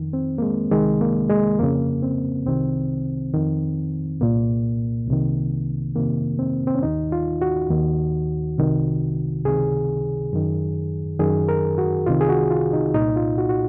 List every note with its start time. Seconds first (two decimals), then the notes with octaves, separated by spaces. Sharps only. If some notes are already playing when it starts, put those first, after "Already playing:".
Already playing: F2 D#3
0.13 C4
0.38 A#3
0.42 G#3
0.71 C2 C3 D#3 G#3
1.01 A#3
1.29 G#3
1.59 F2 C#3 A#3
2.03 C4
2.46 C2 C3 D#3 C4
3.34 F2 D#3
4.21 C2 A#2 A#3
5.08 C2 C3 D#3
5.96 F2 C3 D#3 A#3
6.39 C4
6.67 C4
6.75 C#4
6.83 D#2 D#3 D#4
7.12 F4
7.42 F#4
7.70 D#2 D#3
8.58 C2 C3 D#3
9.45 C#2 C3 D#3 G#4
10.33 F#2 D#3
11.19 F#2 D#3 G#4
11.49 A#4
11.78 F#4
12.06 C2 C3 D#3 F4
12.21 G#4
12.29 F#4
12.51 F4
12.73 D#4
12.94 C2 A#2 D#4
13.16 F4
13.38 F#4
13.49 F#4